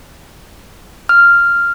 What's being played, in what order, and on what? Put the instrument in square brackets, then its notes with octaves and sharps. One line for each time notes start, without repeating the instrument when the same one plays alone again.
[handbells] F6